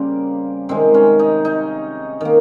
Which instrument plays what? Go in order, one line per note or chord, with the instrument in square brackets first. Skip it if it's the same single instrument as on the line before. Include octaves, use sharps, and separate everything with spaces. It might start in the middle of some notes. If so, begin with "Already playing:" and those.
Already playing: [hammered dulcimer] C#3 G3 A#3 C4
C3 D#3 G#3 C4
C#4
D#4
D#4
D#3 A#3